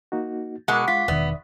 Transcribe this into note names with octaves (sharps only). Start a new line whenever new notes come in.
A#3 D#4 F#4
B2 G#3 A#4 F#5 D6
G#3 F4 B6
E1 D#3 B3 D5 E5 D#6